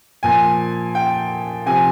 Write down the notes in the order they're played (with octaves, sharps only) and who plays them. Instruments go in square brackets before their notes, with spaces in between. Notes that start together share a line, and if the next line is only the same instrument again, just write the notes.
[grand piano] A#2 F3 G#5
G5
C3 F3 G#5